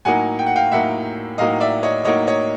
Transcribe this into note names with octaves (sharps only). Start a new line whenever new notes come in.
A2 F#3 A#3 D#4 F#5 G#5
G5
F#5
F5 G5
A2 F#3 A#3 D#4 E5 F#5
A2 F#3 A#3 D#4 D#5 F5
D5 E5
C#5 D#5
A2 F#3 A#3 D#4 C#5 D#5
C#5 D#5